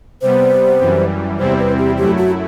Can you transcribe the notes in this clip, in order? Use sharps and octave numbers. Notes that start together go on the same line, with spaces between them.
C3 G3 B3 C5
F#2 E3 G3
E2 C3 G3 C4 E4 C5
B4
G4
F#2 F#3 A3 E4 G4
F#4